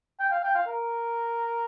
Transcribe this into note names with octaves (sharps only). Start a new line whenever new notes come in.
G5
F5
G5
F5
A#4